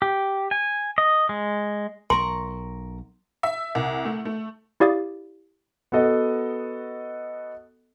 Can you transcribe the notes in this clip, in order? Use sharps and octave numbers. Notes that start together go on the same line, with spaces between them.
G4
G#5
D#5
G#3
B1 A#4 A#5 C6 C#6
E5
C2
A3
A3
E4 G4 D5 F5 D#6 A6
B3 F#4 A4 D#5